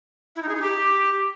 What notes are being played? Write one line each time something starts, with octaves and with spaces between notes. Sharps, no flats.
E4
D#4
G#4
D#4
G4